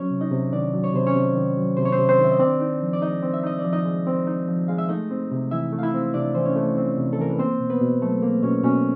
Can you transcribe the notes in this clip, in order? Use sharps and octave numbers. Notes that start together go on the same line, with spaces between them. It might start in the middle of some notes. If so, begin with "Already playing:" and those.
Already playing: F#3 C#4 C#5
C3
D#4 D#5
C3
D#3 D4 D5
F#3
C#5
C3 C5
C#4 C#5
C3
D#3
F#3
C3 C5
C#5
C4 C5
C3
C4 C5
D#3
E5
D#5
C4 D4 D5
D#4
F3
D5
G#3 D#4 D#5
C4
E5
D#4 D#5
D5
F3
D#4 D#5
G#3
C4
D#4
F3
G#3 F5
E5
A3 D#4 D#5
C4
C3
E3 E4 E5
A3
F5
E4 E5
C4
C3 D4 D5
E3 C5
C#4 C#5
A3
C4
C3
A4
E3 A#4
B4
A#3 C4 C5
B2
B3 B4
B2
F#3 A3 A4
A#3 A#4
B2 C#4 C#5
B2 C#4 C#5